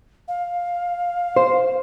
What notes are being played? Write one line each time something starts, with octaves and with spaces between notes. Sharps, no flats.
F5
C5